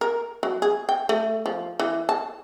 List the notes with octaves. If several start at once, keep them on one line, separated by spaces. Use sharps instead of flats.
A#4
F#3
G#4
G5
A3
F3
E3
A5